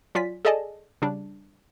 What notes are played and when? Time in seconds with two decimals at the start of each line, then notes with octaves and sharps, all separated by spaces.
0.15 F#3 F4 D5 G#5 B6
0.45 G#4 A4 D5 D#5 G#5 A5
1.02 C#3 G3 D4